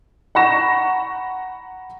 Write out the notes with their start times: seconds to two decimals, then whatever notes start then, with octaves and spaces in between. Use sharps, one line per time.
0.35 F#5 A#5 B5 C#6 A#6 E7